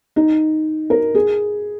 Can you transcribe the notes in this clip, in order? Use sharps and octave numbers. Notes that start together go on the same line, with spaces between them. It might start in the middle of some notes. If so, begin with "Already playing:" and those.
D#4
A#4
G#4